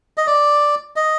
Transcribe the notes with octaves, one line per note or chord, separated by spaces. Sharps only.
D#5
D5
D#5